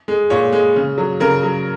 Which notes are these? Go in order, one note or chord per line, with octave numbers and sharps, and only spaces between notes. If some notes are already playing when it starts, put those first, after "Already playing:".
G#3
A#2 C#5
G#3
C#3
F#3
C#3 A#4
F#3